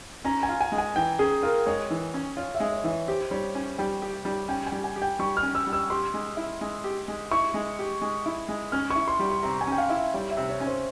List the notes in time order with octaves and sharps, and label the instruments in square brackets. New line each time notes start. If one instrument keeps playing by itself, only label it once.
[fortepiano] C#4 [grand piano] A#5
[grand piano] G#5
[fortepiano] F4
[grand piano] G#5
[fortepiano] G#3
[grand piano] G#5
[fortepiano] E3 [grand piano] G5
[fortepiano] C#4 [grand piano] G#4
[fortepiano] F4 [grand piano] A#4
[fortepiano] G#3 [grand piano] C#5
[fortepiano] E3
C#4
[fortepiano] F4 [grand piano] C#5
[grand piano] E5
[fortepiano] G#3
[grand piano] C#5
[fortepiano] E3 [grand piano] E5
[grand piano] C#5
[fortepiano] G4 [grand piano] C5
[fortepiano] G3 [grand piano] C#5
[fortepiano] C#4
[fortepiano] G3 [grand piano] G5
[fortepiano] G4
G3
[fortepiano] C#4 [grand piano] G5
[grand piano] G#5
[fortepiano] G3
[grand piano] G#5
[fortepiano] G4
[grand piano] G5
[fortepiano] G3 [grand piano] C#6
[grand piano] F6
[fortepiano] C#4
[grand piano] E6
[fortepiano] G3
[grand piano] E6
[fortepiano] G4 [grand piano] C6
[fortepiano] G#3
E4
G#3
G4
G#3
[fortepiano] E4 [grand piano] C#6
[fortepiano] G#3
G4
G#3
E4
G#3
[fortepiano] C#4 [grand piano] F6
[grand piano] C#6
[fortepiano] E4
[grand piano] C6
[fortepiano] G3
[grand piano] C6
[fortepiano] C3 [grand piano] A#5
[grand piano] G#5
[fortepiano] C#4 [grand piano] G5
[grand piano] F5
[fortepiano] E4
[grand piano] E5
[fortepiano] G3 [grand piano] C#5
[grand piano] E5
[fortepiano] C3
[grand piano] C#5
[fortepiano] C#4
[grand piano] C5